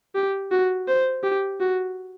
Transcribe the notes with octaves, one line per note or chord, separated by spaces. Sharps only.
G4
F#4
C5
G4
F#4